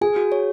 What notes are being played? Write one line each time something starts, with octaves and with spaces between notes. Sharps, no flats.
G#4 G#5
F#4
C#5